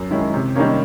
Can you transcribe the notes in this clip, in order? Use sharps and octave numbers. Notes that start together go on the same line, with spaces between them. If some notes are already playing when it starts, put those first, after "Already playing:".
Already playing: F#2
D#3 G#3 C#4 E4
C3
D#3 G3 A#3 C#4